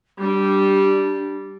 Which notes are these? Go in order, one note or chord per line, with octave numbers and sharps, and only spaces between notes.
G3 D4